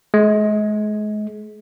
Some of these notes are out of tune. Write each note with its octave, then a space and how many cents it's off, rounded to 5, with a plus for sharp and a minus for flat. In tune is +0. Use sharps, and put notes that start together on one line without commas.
G#3 +35